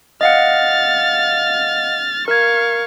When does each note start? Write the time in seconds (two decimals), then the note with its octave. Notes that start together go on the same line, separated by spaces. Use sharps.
0.21 D#5 F5 F#5 F6 A6
2.28 A#4 F5 C#6 G#6